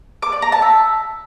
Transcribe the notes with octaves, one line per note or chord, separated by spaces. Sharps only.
D6
D5
A#5
A5
E5